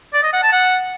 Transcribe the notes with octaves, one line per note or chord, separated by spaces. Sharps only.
D5
D#5
F#5
A5
F#5